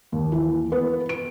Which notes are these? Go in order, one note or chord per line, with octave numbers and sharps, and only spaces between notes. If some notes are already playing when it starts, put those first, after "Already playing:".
D#2
E3
B3
D7